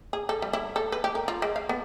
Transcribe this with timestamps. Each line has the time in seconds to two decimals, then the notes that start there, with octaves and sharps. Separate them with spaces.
0.13 G#4
0.29 A4
0.42 G3
0.53 E4
0.76 A4
0.92 B4
1.04 G4
1.15 A#4
1.28 F4
1.42 G#3
1.56 F5
1.69 B3